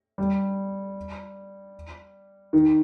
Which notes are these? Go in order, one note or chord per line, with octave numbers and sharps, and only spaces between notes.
G3
D#3